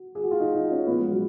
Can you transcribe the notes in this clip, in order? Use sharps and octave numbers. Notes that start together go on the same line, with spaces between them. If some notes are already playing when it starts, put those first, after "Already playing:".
Already playing: F#4
G#4
F#4
F4
D#4
D#4
C#4
A#2 F3 B3
G#3
F#3